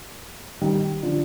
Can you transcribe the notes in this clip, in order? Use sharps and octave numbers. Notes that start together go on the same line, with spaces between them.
D#3 G3
D3 F3